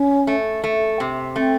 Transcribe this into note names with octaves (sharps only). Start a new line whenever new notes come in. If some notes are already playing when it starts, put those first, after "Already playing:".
Already playing: C#4
A3
A3
C3
A3 C4